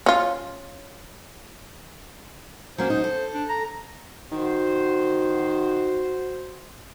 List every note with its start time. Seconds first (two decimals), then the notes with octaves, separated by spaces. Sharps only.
0.06 C#4 F4
2.78 F#3 A#3 C#4 C5
2.90 D#4
3.04 A4
3.34 D4
3.49 A#5
4.32 D#3 F#4 C5